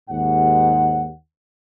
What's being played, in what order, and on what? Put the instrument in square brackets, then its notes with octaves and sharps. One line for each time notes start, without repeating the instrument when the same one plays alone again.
[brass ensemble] D#2 G#2 F#5